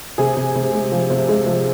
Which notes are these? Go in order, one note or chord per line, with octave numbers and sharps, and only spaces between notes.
C3 G#4 G#5
C3
C3
G#3
F3
C3
G#3
F3